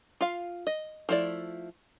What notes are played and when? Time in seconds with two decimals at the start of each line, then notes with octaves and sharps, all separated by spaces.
0.21 F4 F5
0.67 D#5
1.09 F3 A3 E4 G#4 D5